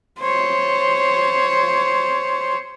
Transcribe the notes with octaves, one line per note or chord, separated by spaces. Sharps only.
C5 C#5